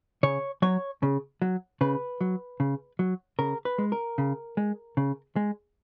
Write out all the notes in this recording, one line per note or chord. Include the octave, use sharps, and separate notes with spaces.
C#3 C#5
F#3 C#5
C#3
F#3
C#3 B4
F#3
C#3
F#3
C#3 A#4
B4
G#3
A#4
C#3
G#3
C#3
G#3